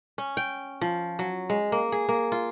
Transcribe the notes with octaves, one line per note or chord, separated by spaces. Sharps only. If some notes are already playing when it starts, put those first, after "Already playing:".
C#4
G5
F3
F#3
G#3
A#3
G#4
A#3
F4